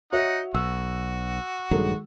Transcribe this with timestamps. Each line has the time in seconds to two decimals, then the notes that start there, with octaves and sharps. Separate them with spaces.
0.12 D#4 F#4 C#5 D#5 E5 F#5
0.54 B1 F#4 E6
1.71 A#1 G2 D#3 F#3 G#3 A4